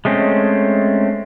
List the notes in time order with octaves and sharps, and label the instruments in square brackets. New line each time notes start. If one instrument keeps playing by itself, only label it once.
[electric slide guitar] G#3 A3 C4 C#4